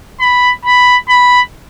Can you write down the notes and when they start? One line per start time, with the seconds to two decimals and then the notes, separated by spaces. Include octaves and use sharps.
0.20 B5
0.65 B5
1.09 B5